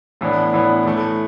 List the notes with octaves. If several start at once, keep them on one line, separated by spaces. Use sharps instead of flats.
A2 E3 B3 D4
A2 E3 B3 D4
A2 E3 A3